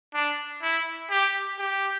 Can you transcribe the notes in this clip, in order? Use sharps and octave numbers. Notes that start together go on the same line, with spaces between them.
D4
E4
G4
G4